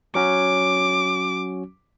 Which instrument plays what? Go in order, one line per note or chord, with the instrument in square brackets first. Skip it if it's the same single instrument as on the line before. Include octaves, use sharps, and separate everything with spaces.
[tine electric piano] F#3 C#4 F#4 [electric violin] D6